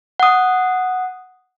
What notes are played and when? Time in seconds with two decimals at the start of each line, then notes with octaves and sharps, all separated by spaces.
0.20 F#5 D#6